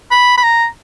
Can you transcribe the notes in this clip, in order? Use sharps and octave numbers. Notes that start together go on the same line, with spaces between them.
B5
B5
A#5